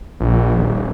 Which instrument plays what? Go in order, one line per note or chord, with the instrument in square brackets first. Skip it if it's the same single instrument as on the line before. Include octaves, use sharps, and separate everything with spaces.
[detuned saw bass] A#1
D#1